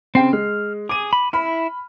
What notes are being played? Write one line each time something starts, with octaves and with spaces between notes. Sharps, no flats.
C#3 C4 G5 C7
G#3 F6
G#4 D6 D#7
B5
E4 B5 F6